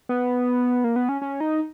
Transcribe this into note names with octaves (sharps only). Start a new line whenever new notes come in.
B3
A#3
B3
C#4
C#4
D#4